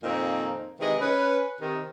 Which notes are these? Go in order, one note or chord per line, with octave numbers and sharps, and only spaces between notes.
F2 A#2 D#3 A#3 C4 D#4
C3 D#3 E3 G#3 G#4 D#5
C#4 B4
C3 D#3